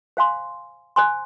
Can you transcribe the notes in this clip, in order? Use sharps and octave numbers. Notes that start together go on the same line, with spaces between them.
C5 F5 G#5 C6
C5 G#5 C6